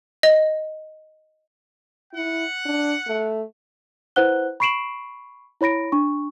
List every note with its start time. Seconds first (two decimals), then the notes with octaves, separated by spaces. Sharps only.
0.23 D#5
2.14 E4 F#5
2.66 D4
3.07 A3
4.16 E4 B4 C5 F#5 F#6 G7
4.60 B5 C#6 C7 D7 E7 F#7
5.61 E4 C#5 B5 A#6 D7
5.92 D4 C#6